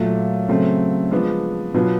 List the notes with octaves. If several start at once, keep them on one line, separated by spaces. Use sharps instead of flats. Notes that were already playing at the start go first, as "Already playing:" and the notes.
Already playing: A#2 F#3 A3
C#3 F#3 A3 C4
F3 G#3 B3 D4
B2 F#3 B3 D4 F4